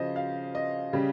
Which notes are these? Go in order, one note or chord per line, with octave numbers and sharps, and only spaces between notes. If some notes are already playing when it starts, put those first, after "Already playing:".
Already playing: C#3 F3 C5 D#5
F5
D#5
C#3 G3